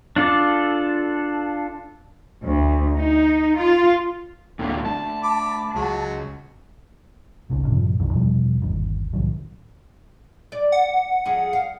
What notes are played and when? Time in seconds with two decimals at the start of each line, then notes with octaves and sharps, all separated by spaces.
0.16 D4 F4 A4 D5
2.42 D2
2.97 D#4
3.57 F4
4.59 D2 A2 D3 A#3
4.86 A3 D4 A5
5.23 B5 D6
5.75 C#2 F#3 G#3
7.50 G#1 C#2 C#3 C#4
7.67 F#2 A2 C3 F3
7.99 B1 F2 D#3 E3
8.13 E2 B2 F3 G3
8.62 G1 D#2
9.13 C2 A2 D#3 F#3
10.52 D5
10.72 F#5
11.25 F2 G#4
11.53 F5